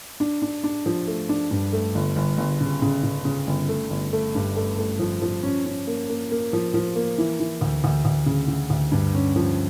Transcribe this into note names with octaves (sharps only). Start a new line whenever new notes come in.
D4
D4
D4
F3
A3
D4
G2
A3
G1
G1
G1
C#3
C#3
C#3
C#3
G1
A3
G1
A3
G2
A3
A3
F3
F3
C#4
C#4
A#3
A#3
A#3
F3
F3
A#3
E3
E3
D2
D2
D2
C#3
C#3
D2
G2
C#4
F3